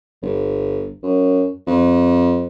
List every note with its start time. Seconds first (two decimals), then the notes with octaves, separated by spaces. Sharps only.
0.22 G1
1.03 F#2
1.67 F2